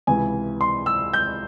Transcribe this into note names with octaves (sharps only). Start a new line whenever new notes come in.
C#2 C3 E3 G#5
C6
E6
G6